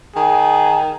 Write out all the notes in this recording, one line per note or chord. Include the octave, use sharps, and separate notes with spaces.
D#3 G#4